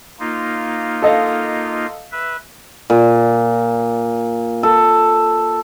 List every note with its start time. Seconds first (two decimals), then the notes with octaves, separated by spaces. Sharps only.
0.20 A#3 D#4 F4
1.02 A4 D#5 F5
2.12 B4 E5
2.90 A#2
4.63 A4